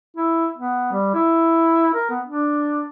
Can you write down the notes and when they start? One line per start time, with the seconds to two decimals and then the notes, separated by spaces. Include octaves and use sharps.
0.17 E4
0.57 B3
0.92 G3
1.14 E4
1.94 A#4
2.10 B3
2.25 D4